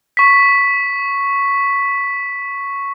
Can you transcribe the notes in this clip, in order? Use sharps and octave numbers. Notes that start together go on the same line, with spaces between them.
C#6 B6